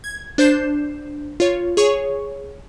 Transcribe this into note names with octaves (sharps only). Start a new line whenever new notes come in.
G#6
D4 C5 G6 C7 E7
F4 C#5
G#4 C#5 C#6